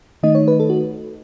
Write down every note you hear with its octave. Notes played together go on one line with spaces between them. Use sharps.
D#3 A3 D#4 D#5
C#5
B4
A4
F#4